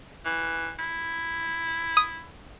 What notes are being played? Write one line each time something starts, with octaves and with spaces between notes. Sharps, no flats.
E3
E4
D#6